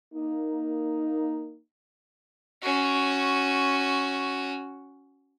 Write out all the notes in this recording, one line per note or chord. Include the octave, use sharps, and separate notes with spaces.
A#3 D#4
C#4 F#4